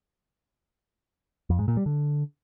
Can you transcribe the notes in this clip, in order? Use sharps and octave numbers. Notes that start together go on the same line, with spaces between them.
F2
G#2
A#2
G3
D3